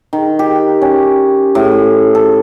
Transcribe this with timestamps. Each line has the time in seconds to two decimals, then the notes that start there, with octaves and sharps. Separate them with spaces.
0.13 D#3
0.39 G4
0.82 C#4
1.55 A2
2.15 A4